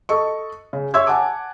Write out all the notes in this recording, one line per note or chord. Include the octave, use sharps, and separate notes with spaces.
A4 D#5 C#6
C#3
C#5 E5 C6 E6 G#6
F#5 G#5 A5 D6